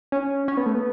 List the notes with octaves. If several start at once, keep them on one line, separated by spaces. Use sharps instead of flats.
C#4
C#4
B3
A3
B3